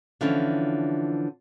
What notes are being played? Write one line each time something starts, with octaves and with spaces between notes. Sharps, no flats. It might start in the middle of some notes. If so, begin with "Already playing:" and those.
D3 E3 F3 C#4 D4